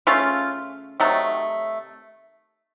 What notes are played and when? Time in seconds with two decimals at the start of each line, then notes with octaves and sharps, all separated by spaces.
0.07 C#3 A3 C#4 F4
1.00 C3 D#3 F#3 A3